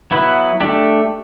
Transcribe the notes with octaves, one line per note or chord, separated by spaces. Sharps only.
F#3 B3 E4 B4
A3 D4 G4